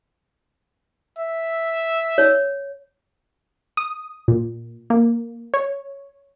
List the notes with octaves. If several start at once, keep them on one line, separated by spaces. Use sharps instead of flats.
E5
C#5
D#6
A#2
A#3
C#5